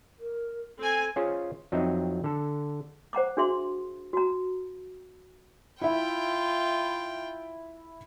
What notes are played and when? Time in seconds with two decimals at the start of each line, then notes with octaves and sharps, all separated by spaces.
0.20 A#4
0.78 C4 A4 G#5
1.16 C#4 F4 G#4 C5 C#5
1.72 F2 F#3 C4 D#4 D#5 E5
2.24 D3 A4
3.13 C5 F#5 A#5 D6
3.37 D4 F#4 G#4 E5 C6
4.13 F#4 A#5
5.82 E4 F4 E5 G5